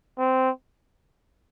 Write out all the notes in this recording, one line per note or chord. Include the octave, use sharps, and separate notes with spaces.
C4